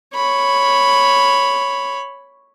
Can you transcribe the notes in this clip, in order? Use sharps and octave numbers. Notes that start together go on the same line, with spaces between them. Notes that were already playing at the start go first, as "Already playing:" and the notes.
C#5 B5